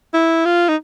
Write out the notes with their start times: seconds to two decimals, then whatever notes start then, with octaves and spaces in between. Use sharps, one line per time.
0.14 E4
0.45 F4
0.69 D#4